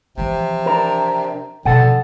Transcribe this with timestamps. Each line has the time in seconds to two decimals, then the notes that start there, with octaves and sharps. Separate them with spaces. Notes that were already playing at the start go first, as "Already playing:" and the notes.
0.18 C3 E3 F3
0.66 D4 A#4
1.65 B2 D3 F3 C#4 A4 F#5